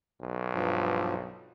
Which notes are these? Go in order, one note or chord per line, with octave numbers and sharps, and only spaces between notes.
B1
G2 F3